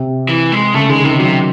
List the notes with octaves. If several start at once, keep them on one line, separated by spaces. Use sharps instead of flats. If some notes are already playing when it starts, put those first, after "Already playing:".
Already playing: C3
E3
G#3
C#3 A3
D#3 G#3
C3 D#3
C3 F#3